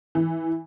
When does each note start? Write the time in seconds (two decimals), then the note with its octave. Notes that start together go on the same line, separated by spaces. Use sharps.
0.15 E3